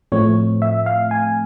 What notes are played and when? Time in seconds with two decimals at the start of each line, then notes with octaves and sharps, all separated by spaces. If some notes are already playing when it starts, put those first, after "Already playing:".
0.12 A2 F3 A3 C4 C#5
0.62 E5
0.86 F5
1.11 G#5